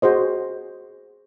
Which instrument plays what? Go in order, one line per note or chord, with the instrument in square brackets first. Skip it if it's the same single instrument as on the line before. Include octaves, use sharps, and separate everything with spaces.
[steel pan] F#4 G#4 C5 D#5